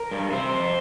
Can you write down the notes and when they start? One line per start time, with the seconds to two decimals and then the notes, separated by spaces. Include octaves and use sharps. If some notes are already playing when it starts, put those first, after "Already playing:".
Already playing: A#4
0.11 G2
0.31 C3 C5
0.53 F2